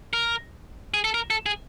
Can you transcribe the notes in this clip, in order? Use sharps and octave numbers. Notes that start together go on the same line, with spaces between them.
A#4
G#4
A4
A#4
A4
G#4